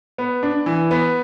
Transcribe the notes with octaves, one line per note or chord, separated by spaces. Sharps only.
B3
D4
E3
B3